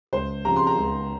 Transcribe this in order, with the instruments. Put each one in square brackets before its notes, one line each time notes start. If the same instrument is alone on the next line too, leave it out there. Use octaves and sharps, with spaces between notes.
[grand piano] C#2 [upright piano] C5
[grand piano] C#3 F3 C4 G4 [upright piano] A#5
[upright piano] C6
A#5
[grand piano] C#2